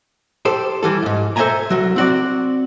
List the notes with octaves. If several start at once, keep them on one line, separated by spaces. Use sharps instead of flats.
G4 A4 C5
E3 G3 A4
E2 G#2
A4 C5 D#5 E5 G#5 A#5
C2 F#3
C4 F#4 D5